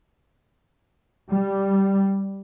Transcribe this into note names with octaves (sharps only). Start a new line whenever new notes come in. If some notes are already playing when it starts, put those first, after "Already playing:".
G3